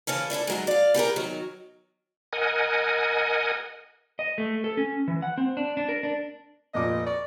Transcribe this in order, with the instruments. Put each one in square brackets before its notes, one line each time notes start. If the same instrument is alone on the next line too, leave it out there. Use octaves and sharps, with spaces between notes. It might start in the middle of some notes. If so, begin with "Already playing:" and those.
[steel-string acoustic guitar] C#3 E3 C#4 A4
D4 E4 G#4 A4
D#3 F#3 G#3
D5 F5
B3 G4 G#4 A#4
D#3 F#3
[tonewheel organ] A#4 D#5 F#5 G#5
[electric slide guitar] D#5
A3
A4
C#4
E3
F#5
C4
D4
D4
A#4
D4
[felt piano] F1 A#2 D6 [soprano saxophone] D#5
[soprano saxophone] D5 [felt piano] C#6